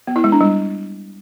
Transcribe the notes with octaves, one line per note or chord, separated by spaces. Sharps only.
B3
E4
G#3
D4
G3